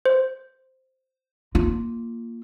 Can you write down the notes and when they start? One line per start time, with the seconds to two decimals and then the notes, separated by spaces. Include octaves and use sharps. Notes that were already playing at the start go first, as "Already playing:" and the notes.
0.06 C5
1.55 A#3 F4